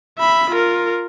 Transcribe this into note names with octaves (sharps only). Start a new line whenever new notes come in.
E5 B5
F4 A#4